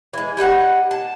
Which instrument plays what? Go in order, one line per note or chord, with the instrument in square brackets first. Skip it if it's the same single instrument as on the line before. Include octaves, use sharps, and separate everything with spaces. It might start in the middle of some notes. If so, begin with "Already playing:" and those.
[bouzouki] E3 G#3
G3 D#4 A#4 F#5
A5